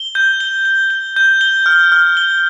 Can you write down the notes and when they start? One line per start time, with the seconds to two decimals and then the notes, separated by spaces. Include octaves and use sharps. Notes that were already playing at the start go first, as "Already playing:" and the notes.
Already playing: G7
0.15 G6
0.40 G7
0.65 G7
0.90 G7
1.16 G6
1.41 G7
1.66 F6
1.92 F6
2.17 G7